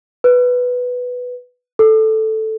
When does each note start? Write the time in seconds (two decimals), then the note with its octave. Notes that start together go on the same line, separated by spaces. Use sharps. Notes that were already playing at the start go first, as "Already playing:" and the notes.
0.24 B4
1.79 A4